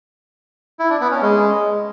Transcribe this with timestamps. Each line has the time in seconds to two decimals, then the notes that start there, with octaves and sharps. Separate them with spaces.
0.79 E4
0.90 D4
1.01 B3
1.11 C#4
1.22 G#3